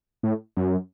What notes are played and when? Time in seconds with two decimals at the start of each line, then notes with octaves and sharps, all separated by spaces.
0.23 A2
0.57 F#2